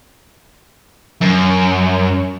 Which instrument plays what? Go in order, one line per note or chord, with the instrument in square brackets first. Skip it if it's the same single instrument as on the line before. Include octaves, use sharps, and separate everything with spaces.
[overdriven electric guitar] F#2